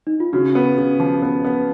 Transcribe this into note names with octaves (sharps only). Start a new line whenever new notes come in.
D#4
F4
C#3 F#4
B3
C#3
F3
B3
B3